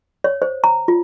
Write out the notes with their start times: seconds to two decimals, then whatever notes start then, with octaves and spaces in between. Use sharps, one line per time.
0.24 C#5
0.42 C5
0.64 A#5
0.88 F4